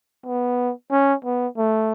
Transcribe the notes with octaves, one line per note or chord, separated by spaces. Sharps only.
B3
C#4
B3
A3